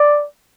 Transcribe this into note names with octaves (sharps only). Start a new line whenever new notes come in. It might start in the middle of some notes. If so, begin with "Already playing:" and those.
Already playing: D5